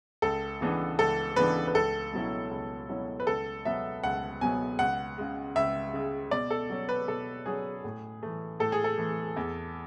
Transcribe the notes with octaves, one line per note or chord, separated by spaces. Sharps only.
C#2 A4
C#3 E3 B3 D4
C#2 A4
C#3 E3 B3 D4 B4
B4
C#2 A4
B2 F#3 C#4 E4
C#2
B2 F#3 C#4 E4
B4
C#2 A4
B2 F#3 B3 E5
C#2 F#5
B2 F#3 B3 G#5
C#2 F#5
C#3 G#3
C#2 E5
C#3 G#3
B2 D5
A4
F#3 C#4
B4
B2 A4
F#3 C#4 G#4
A2
E3 A3
A2 A4
G#4
A4
E3 A3
E2